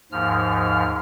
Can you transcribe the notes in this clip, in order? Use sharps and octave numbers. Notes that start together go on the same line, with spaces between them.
D#2 G#2 F3 F6